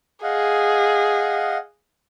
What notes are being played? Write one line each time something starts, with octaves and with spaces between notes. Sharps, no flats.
G#4 D#5 F5 F#5